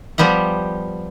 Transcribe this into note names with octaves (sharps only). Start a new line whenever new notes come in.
F3 G3 B3 G4 F#5